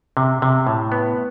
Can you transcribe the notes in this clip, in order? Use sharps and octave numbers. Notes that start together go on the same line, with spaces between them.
C3
C3
A2
B3